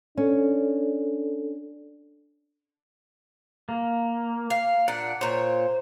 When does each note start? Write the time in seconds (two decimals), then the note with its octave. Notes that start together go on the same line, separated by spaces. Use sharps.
0.17 C#4 D4 A4
3.69 A#3
4.50 F5
4.88 A#2 D4 F#5
5.21 A#2 C5 C#5